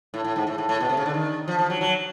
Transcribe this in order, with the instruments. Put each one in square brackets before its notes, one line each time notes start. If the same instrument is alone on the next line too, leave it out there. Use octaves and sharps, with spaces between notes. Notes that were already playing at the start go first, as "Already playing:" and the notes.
[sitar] A2
A2
G#2
A2
A2
A2
B2
C3
C#3
D3
D#3
F3
F3
F#3
F#3